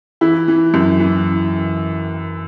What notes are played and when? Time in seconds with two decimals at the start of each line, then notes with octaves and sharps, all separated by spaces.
0.21 E3 E4
0.48 E3
0.74 F#2
1.00 E3